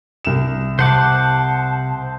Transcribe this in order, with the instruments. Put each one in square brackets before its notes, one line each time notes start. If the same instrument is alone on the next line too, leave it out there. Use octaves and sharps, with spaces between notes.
[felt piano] C2 E7
[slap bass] C3 [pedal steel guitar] C5 F#5 D6 [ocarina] A5